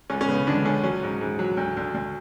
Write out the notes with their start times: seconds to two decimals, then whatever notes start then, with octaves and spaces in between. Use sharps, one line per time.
0.10 C#2 C#4
0.21 C#4
0.28 C#3 B3
0.47 C#2 D3 D4
0.65 C#2 C#4
0.83 F#3 C#4
1.03 G#2
1.21 G#2
1.39 F#3
1.57 D2
1.77 D2
1.95 D2